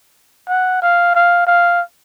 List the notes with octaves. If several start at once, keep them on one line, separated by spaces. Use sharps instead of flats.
F#5
F5
F5
F5